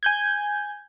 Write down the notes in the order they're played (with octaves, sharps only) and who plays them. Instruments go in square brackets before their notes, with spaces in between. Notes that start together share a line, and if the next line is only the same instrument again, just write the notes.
[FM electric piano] G#5 G6 G#6